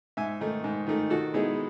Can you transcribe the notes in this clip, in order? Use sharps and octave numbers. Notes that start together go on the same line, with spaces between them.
G#2 E5 G#5
D#3 A3 D#4
G#2
D#3 A3 D#4
D#3 F#4 A4
G#3 B3 D#4 E4 G#4